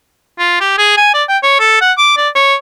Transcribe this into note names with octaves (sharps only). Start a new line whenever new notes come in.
F4
G4
G#4
G#5
D5
G5
C#5
A4
F#5
D6
D5
C#5